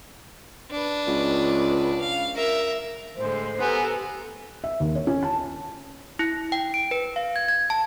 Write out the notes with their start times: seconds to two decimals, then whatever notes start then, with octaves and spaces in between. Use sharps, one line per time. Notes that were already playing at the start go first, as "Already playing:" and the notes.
0.71 D4 B4
1.07 C#2
2.00 F5
2.35 A#4 E5
3.16 A2 D3 G#3 C5
3.61 B3 G4 A4 A#4 G#5
4.64 E5
4.80 D#2
4.96 C#5
5.07 C#4
5.23 A5
6.19 E4
6.52 G5
6.74 D7
6.91 B4
7.16 F5
7.36 G#6
7.48 G#6
7.70 A5